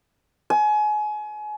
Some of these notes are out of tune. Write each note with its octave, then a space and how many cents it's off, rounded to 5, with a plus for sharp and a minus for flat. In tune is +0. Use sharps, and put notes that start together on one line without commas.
G#5 +30